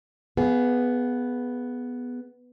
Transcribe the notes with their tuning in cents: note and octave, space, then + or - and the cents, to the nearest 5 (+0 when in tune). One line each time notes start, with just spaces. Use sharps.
B3 +0 G#4 +15 F5 -20